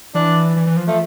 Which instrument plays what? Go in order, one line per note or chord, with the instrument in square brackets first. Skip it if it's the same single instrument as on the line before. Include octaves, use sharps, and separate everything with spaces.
[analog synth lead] E3 [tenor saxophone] D4
[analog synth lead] E3
E3
F3
[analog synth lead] F3 [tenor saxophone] A3